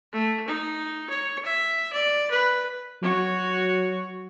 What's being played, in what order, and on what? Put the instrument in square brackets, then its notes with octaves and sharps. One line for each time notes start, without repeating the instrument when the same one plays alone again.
[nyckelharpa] A3
D#4
C#5
E5
D5
B4
[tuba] F#3 [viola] F#4 C#5